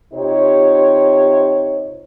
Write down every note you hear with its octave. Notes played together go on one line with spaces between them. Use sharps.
C3 D#4 F4 G4 C5 C#5